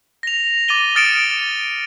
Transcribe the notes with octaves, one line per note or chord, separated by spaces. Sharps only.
A#6 F7
D6 A6 D#7 G7
D#6 F6 A6 C#7 D7 E7